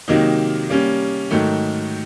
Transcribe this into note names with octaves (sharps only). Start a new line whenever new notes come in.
C3 D#3 F#3 A#3 D#4
G3 A#3 C#4
G#2 D#3 F#3 A3